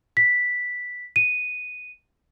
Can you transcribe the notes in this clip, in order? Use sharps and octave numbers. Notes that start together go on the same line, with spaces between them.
B6
D#7